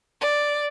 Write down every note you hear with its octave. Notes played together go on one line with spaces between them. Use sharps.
D5